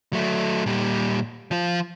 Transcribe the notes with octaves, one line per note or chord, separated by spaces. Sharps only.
F#3 A3
A#2 G3
F3 F4